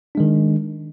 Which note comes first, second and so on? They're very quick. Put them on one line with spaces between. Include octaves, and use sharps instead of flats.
D4 G#3 D#3